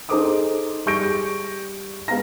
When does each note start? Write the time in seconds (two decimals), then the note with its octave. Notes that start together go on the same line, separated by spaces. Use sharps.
0.09 D#4 G#4 A4 C5 D6 D#6
0.86 G3 G#4 C#6 G6 A#6 D7
2.08 G#3 B3 F5 A#5 A#6